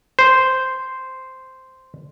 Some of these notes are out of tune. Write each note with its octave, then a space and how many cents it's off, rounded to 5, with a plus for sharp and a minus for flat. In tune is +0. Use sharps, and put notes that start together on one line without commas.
C5 -5